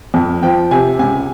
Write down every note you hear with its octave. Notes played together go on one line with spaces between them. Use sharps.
F2
F3 G5
C3 G#5
C#2 G#5